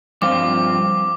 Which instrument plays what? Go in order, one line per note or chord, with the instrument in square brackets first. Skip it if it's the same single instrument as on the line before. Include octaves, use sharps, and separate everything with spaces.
[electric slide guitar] G2 F3 C4 F4 [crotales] D6